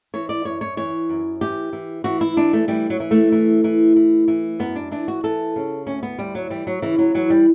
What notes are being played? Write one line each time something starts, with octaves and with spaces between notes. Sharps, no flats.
E3 C#5
D5
F#2 C#5
C#5
E3 C#5
F#2
E3 G4
E3
E3 F#4
E4
E3 D4
A3
E3 G3
F#3
E3
A3
E3
E3
E3
E3
F#2 B3
D4
E3 D4
F#4
E3 A4
C#3
D2 C#4
B3
D2 G3
F#3
E3 G3
F#3
C#3 E3
F#3
E3 F#3
G3